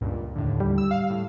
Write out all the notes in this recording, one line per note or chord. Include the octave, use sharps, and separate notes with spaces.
C#2 G2 A#2
D#2 A2 D3
G3
E6
F5
A2